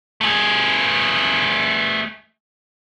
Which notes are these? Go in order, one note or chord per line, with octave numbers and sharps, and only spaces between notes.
A3 G#4